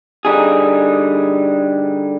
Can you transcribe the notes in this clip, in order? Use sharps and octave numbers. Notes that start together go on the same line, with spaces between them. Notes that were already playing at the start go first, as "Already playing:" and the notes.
D3 G3 D#4 G#4